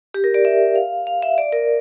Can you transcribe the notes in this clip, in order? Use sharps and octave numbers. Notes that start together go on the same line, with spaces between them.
G4
A#4
D5
E5
F5
F5
E5
D5
A#4